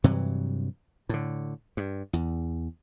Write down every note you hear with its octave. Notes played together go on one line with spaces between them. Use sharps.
G2 C3 E3 F#3
A2 D3
G2
E2